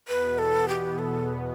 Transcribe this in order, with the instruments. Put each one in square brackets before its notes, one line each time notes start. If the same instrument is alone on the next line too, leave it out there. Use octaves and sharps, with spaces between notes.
[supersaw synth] E2 B2 B3 [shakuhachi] B4
[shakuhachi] A4
G4
A4